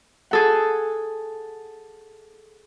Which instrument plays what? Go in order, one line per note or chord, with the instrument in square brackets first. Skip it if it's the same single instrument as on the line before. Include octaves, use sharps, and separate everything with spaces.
[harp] G#4 A4 F#5